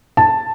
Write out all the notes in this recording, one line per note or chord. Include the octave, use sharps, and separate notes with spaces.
A5